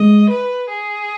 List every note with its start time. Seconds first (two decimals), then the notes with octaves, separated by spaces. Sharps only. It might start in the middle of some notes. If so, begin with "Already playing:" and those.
Already playing: G#3 D#5
0.30 B4
0.69 G#4